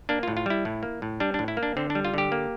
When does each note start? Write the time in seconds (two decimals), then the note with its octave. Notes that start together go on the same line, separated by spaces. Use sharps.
0.09 A#3 D4
0.23 F4
0.28 A2
0.37 F4
0.46 G3 E4
0.65 A2
0.83 A#3
1.02 A2
1.20 G3 D4
1.34 D4
1.39 A2
1.48 E4
1.57 A#3
1.63 D4
1.77 D3 C4
1.90 D4
1.95 G3
2.05 F4
2.14 D3 G4
2.32 A#3